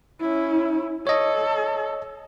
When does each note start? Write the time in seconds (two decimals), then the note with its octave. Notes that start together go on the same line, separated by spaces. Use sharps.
0.21 C#4 E4
1.07 A4 C#5 D#5